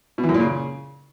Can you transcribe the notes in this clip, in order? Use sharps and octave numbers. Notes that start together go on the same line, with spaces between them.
B2
E3
F#2
A#2
C#3